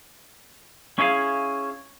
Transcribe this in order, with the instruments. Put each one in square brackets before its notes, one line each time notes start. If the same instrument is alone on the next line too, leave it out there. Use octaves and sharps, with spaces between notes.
[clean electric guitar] C#4 E4 G#4 F5